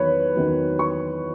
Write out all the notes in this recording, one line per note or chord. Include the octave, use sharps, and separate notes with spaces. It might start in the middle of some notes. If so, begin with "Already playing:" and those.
Already playing: E2 D#3 F#3 B4 C#5
E2 D#3 F#3
C#6